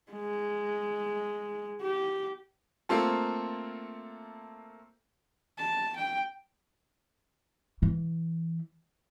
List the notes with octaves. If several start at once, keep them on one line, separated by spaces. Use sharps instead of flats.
G#3
G4
A3 A#3 C4 F4 A4
A5
G5
E3 E4